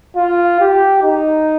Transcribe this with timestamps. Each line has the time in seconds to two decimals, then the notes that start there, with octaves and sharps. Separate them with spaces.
0.16 F4
0.60 G4
1.03 D#4